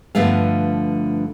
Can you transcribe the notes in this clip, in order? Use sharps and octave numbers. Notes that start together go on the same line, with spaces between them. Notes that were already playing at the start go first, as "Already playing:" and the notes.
G2 D3 F3 A3 B3 F5